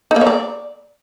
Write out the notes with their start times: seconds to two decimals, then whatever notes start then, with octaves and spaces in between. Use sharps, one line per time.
0.11 D#4
0.16 A#3
0.21 C#5
0.27 D5